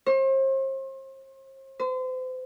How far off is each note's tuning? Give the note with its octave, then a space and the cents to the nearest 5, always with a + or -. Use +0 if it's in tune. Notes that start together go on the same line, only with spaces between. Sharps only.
C5 +40
C5 -35